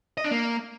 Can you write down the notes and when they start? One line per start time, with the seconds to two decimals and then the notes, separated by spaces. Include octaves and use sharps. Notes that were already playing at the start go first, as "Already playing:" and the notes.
0.18 D#5
0.24 D4
0.31 A#3